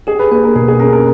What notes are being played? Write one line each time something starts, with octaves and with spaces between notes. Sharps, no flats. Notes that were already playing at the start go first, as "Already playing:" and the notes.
G4 G#4
B4
A#3 B4
A#4
B2 G#4
G#4
C#4 A#4
A#4